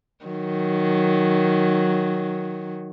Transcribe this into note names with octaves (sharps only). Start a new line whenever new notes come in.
D#3 F#3